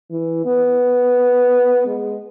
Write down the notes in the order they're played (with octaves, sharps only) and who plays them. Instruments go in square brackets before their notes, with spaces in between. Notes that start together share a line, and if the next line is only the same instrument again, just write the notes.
[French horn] E3
B3
G#3